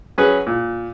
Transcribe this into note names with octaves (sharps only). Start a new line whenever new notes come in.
F#3 C#4 G#4 B4
A#2